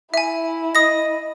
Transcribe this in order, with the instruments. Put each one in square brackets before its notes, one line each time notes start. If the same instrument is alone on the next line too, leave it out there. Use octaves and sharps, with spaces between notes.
[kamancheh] E4 [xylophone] E5 G#5
[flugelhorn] D#5 [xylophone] D#6 A#6